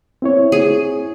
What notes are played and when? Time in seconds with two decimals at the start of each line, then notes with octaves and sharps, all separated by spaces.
0.22 C4 E4 C#5
0.52 G#4